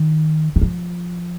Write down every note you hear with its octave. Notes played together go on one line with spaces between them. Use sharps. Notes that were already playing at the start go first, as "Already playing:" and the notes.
Already playing: D#3
D#3
F3